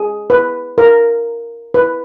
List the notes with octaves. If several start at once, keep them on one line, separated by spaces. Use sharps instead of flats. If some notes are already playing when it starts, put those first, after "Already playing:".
Already playing: G#4
B4
A#4
B4